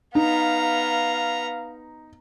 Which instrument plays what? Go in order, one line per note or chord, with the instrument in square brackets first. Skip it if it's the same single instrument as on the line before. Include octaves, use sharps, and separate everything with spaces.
[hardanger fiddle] B3 A#5 [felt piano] D#4 [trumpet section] F5